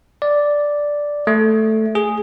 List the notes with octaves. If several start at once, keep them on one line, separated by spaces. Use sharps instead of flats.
D5
A3
G#4